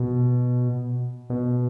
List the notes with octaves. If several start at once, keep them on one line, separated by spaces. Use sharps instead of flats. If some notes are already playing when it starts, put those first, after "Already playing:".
Already playing: B2
B2